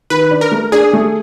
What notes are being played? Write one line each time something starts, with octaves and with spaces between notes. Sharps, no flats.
D#3 B4
D4
A#4
A3
D4 G#4
A3